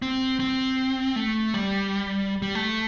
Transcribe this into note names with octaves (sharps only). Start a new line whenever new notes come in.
C4
C4
A3
G3
G3
A3